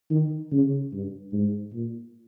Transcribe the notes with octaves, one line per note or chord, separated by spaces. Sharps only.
D#3
C#3
G2
G#2
A#2